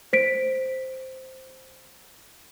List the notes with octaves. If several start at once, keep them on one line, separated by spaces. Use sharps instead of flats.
C5 B6 D7